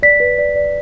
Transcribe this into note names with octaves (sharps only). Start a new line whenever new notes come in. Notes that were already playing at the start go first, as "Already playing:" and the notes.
D5 B6
B4
D5
D5